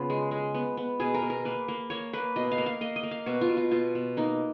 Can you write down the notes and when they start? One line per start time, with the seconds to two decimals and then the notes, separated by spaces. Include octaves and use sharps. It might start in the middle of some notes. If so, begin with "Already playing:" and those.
Already playing: C#3 B3 F4
0.10 G#3
0.31 G#3
0.54 B3
0.77 B3
1.00 B2 G#4
1.14 A#4
1.22 B2
1.30 A#4
1.45 A#3 B4
1.68 A#3
1.90 A#3 C#5
2.13 A#3 B4
2.36 B2 D#5
2.51 F5
2.58 A#3
2.66 F5
2.81 A#3 D#5
2.96 D#5
3.03 A#3
3.11 F5
3.26 B2 F#4
3.41 F4
3.49 B2
3.57 F4
3.71 B2 F4
3.95 B2
4.17 A#3 D#4